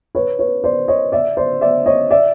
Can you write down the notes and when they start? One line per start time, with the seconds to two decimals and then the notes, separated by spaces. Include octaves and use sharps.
0.15 B4 C#5
0.39 B4 C#5
0.64 C5 D5
0.88 C#5 D#5
1.12 D5 E5
1.37 C5 D5
1.61 D5 E5
1.86 C#5 D#5
2.10 D5 E5